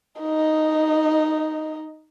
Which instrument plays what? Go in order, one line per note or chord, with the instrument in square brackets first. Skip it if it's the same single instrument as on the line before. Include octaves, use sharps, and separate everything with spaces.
[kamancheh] D#4 D#5